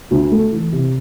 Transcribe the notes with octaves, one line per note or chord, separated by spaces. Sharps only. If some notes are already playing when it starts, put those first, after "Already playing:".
D2
A3
E3
C3